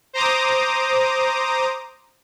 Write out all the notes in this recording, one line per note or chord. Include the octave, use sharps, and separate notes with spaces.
C5 A#5 D6 D#6